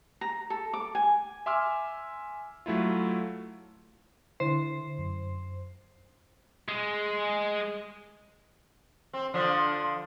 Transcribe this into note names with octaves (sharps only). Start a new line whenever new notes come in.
A#5
A4
D6
G#5
E5 G#5 C6 D6 E6 F6
F#3 A3 E4 F4
D3 E4 C5
F#2
G#3
C4
D3 F3 D4